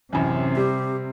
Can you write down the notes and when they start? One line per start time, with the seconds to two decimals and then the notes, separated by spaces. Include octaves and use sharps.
0.13 A1 F#2 C3
0.57 G3 G4